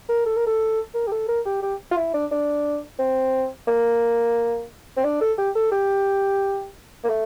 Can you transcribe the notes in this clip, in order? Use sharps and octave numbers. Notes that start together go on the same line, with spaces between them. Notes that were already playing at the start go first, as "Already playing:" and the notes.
A#4
A4
A#4
A4
A#4
G4
A4
A#4
G4
G4
F4
E4
D4
D4
C4
A#3
C4
D4
A4
G4
A4
G4
A#3
A3